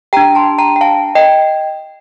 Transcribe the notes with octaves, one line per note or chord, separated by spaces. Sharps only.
D4 G4 G5 A#5
A5 C6
G5 A#5
G5
F5 A5
D#5 G5